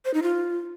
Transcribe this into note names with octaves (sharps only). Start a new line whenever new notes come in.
C5
D#4
F4